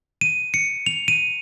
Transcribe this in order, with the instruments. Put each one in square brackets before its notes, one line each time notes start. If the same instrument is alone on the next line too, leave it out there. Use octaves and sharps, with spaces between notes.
[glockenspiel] D#7
C#7
F7
D#7